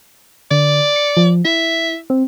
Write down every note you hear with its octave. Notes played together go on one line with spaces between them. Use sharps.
D3 D5
C#7
F3
E4 E5
C4